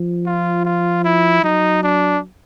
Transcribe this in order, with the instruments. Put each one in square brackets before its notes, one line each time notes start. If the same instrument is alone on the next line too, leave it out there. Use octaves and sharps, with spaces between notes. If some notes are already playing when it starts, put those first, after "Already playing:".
Already playing: [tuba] F3
[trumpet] F4
F4
E4
[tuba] F#3 [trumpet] D#4
[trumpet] D4